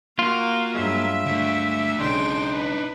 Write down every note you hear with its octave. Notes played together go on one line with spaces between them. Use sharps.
A#3 F4 F#4 F5
G2 F#3 G#3 E5
D3 A3
B1 C#3 G#3 D4 D#4 G5 C6
B4